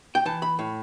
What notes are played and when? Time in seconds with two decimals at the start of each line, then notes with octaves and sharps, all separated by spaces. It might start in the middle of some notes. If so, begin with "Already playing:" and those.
0.15 G5
0.25 E3 A5
0.42 B5
0.59 A2